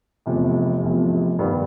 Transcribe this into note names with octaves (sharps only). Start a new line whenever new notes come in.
F1 E2 C3 F3
F1 E2 C3 F3
G2 D#3 G3 B3